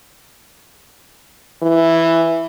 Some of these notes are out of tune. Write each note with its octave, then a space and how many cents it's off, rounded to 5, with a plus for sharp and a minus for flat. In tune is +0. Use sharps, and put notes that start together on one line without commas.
E3 +0